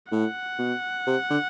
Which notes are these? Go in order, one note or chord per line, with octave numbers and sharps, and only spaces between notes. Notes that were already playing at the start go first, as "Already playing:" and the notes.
A2 F#5
B2
C3
D3